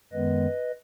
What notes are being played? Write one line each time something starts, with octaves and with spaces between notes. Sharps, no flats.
F#2 D#3 G#3 B3 B4 D#5